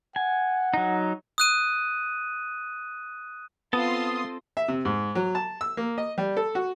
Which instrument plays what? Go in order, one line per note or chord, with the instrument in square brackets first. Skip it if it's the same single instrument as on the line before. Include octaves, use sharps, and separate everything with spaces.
[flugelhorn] F#5 [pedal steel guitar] G#5
[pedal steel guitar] F#3 D#4
[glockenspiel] D#6 F#6 D#7
[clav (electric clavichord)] B3 [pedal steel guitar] C4 A4 A5 [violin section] F4 C6 [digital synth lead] D#6
[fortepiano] E5
C3
G#2
F#3
A5
E6
A#3
D#5
G3
A4
F#4